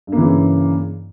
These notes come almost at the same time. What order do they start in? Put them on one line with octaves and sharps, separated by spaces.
G2 A#3 E3 C#3